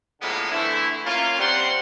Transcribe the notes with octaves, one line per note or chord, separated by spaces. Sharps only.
A2 D3 F3 G#3 A#3 B3
D3 E3 A3 E4
A#3 C#4 F4
G3 C4 C5 D5 F#5 C6